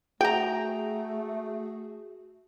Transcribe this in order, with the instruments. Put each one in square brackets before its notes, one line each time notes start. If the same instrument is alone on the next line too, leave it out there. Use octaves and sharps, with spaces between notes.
[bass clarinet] A3 [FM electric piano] F#4 G#4 [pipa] G5 A#5